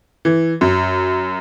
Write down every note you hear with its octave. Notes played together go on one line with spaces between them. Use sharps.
E3
F#2